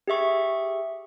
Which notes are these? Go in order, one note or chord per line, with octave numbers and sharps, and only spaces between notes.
G4 G#4 E5 C#6